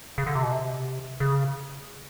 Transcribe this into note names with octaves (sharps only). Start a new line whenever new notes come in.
C#3
D3
C3
B2
C3
C#3